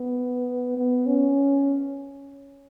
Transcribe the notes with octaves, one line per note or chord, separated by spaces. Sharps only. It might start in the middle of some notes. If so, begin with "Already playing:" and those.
Already playing: B3
B3
C#4